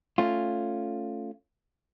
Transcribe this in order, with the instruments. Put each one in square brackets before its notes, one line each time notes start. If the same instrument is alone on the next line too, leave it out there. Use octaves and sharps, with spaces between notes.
[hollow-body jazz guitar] A3 C#4 F4